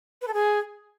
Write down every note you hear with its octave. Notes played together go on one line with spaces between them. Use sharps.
B4
A4
G#4